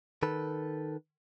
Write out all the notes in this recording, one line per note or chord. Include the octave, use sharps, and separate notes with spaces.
D#3 A4 B4